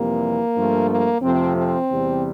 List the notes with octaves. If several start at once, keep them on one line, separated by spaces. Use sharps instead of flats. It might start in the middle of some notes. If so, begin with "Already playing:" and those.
Already playing: F2 C3 E3 G3 A#3
G2 F3 A3
A#3
F2 C3 F3 A3 C4
C4
E2 C3 G3